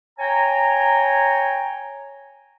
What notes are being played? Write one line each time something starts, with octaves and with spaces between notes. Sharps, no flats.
C#5 G5 G#5 A#5